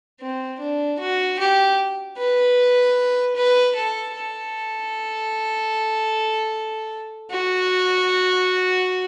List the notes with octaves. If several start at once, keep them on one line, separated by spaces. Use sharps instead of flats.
C4
D4
F#4
G4
B4
B4
A4
A4
F#4